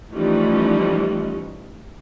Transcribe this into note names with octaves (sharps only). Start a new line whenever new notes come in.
E3 F3 G3 A3 C#4 D#4